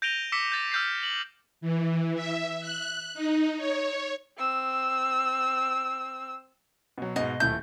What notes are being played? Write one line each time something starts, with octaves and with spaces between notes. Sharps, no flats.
G6 A#6 D7 D#7 F7 G7
D6 E6 B6 C#7 E7 G7
G6 A6
E6 F6 G6 A6 C7
F#7
E3
E5
F#6
D#4
C#5
C4 E6
B2 F#3
G#2 B2 D#5
D#1 A3 E4 G6